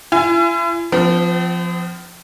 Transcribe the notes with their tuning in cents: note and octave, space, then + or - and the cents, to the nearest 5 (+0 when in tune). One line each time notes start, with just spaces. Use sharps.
E4 +45 G#5 +0
F3 +0 C4 -45